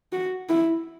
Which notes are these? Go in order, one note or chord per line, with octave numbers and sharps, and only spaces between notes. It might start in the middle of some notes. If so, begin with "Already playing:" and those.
F#4
E4